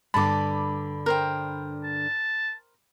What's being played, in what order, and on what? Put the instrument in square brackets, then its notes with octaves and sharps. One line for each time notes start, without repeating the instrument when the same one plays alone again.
[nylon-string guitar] G2 D3 [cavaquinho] A5 [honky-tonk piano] B5 D6
[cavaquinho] A#4 C5 G5
[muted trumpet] A5